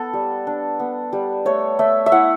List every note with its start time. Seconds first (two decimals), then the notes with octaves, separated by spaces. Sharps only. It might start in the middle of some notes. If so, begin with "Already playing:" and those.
Already playing: B3 A4
0.13 G3
0.47 D4
0.80 B3
1.13 G3
1.45 A3 C#5
1.79 A3 E5
2.06 E5
2.12 E4 F#5